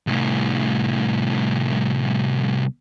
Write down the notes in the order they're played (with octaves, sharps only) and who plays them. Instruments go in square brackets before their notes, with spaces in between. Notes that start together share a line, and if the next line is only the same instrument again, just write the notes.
[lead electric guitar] C2 A2